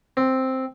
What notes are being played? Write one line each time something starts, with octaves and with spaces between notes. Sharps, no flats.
C4